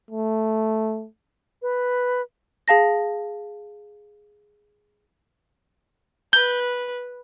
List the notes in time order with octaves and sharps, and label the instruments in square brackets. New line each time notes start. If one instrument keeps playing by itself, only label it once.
[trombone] A3
[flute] B4
[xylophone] G#4 F5 A5 A#6
[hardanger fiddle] B4 [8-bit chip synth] G6